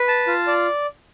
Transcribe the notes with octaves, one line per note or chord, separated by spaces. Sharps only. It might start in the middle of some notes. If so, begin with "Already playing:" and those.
Already playing: B4
A5
F4
D5